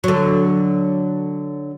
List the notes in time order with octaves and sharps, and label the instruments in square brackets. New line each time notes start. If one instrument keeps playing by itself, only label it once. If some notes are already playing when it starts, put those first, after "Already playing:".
[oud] D3 F#3